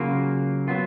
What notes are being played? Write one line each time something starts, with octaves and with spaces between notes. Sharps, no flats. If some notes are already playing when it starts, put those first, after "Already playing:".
Already playing: C#3 F#3 A#3 F4
F#3 B3 F4